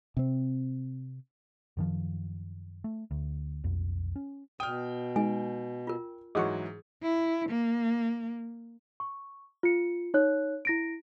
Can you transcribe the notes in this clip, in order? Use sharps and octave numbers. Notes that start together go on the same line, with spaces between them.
C3 C4
F#2 D#3 F3
A3
D2
B1 F2
C#4
B2 G5 D#6 F6
G#3 D#4 G#5
F4 A#4
G#2 E3 F#3 G#4 D#5 F#5 C#6
E4
A#3
C#6
F4 C#7
D#4 C#5 F#6
E4 A#6 D7